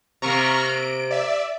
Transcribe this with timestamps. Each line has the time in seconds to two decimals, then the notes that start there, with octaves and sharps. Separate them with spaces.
0.22 C3 A#3 A#5 C#6 F6
0.68 D7
1.11 D5 E5